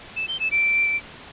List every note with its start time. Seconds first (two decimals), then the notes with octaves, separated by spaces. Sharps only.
0.16 E7
0.28 G7
0.40 E7
0.52 D7